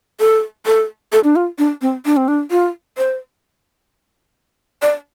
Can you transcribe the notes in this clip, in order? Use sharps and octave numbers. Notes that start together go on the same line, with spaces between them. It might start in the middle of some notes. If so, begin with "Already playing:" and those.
A4
A4
A4
D4
F4
D4
C4
D4
C4
D4
F4
C5
D5